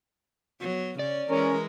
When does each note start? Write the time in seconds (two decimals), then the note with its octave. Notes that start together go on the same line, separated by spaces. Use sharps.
0.61 F#3 B3
0.99 C#3 C#4 D5
1.30 E3 G#3 C#4 A#4